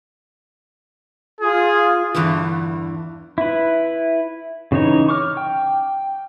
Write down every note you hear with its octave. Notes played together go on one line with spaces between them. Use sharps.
F4 G#4
E2 G2 D3 E3
E4 B4
C#3 E3 D#4 C#5
C#6 D6 F6
G5